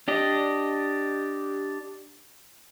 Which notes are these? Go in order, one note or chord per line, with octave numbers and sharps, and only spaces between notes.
D4 G4 D#5